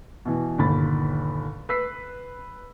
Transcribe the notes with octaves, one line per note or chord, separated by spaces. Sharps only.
B2 E3
G1 D#2 A#2 B5 A6
B4 E6 B6 C7